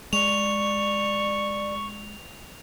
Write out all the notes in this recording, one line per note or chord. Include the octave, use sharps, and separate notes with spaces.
G#3 D5 C#6 F7